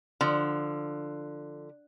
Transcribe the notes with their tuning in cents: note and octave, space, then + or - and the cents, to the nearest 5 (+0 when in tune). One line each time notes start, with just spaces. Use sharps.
D3 +10 F3 +0